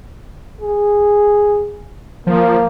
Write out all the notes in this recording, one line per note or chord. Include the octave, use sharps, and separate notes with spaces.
G#4
F3 A#3